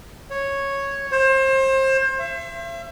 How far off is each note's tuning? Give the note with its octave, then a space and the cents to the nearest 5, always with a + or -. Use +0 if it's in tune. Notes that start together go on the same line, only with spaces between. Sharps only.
C#5 -5
C5 +30
E5 +40